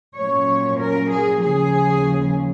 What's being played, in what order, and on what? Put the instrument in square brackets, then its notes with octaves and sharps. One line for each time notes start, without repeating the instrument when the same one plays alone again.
[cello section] A#2 F#3 A#3 C#4 C#5
A#4
G#4
D#2 C#3 F3 G#4